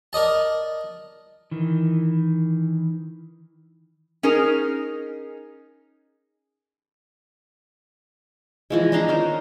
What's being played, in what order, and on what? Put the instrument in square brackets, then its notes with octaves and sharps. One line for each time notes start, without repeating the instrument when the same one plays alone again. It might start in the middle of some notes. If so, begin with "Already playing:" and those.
[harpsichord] A#4 D5 D#5 A5
[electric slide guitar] D#3 E3
[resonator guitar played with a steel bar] C#4 D#4 G#4 A#4
[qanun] E3 F3 G#3
D4 D#4 A#5 C6
D#3 C#4 A#4 C5